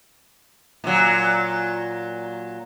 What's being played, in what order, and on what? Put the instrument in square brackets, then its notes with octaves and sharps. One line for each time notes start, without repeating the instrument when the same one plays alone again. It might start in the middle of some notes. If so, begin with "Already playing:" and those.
[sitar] A#2 F#3